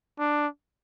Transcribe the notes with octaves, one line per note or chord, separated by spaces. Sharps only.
D4